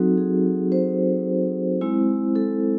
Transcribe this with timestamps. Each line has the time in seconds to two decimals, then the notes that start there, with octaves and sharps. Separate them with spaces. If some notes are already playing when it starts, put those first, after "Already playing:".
Already playing: F#3 C4 D#4 F#4 A4
0.17 G#4
0.72 C5
1.81 G#3 C4 E4
2.35 A4